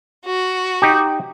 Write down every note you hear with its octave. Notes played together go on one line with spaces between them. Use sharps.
F#4
D#4 G4